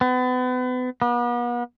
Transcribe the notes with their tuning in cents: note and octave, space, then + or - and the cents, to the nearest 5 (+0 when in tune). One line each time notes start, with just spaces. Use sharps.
B3 +35
B3 -40